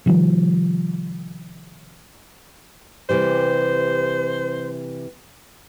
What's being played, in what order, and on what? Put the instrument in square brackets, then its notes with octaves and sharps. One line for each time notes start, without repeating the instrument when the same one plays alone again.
[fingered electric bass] C3 D#3 F3 G3
[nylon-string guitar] C3 E3 G3 [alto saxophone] C5